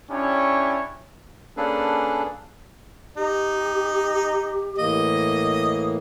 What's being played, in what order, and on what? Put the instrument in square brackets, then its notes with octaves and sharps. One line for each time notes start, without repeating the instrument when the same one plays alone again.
[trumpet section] C#4 D4 E4 G4 C#5
[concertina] A#3 C#4 D4 G#4 A4 B4
[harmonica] D#4 [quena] G4
[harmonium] A2 E3 A#3 [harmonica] D#5